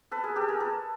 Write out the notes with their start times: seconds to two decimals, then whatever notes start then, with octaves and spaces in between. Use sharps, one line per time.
0.11 A4 B4
0.23 G#4 A#4
0.36 G4 A4
0.48 G#4 A#4
0.60 A4 B4